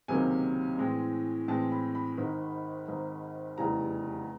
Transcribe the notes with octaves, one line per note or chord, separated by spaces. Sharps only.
C#2 C3 D#3 F#3 A#3 G#5
A2 E3 G#3 C4
A2 E3 G#3 C4 A5
B5
B5
G#1 G#2 D#3
G#1 G#2 D#3
F1 E2 C#3 E3 G3 A#5